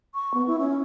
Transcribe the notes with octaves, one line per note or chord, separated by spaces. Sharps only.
C#6
B3
E4
C#4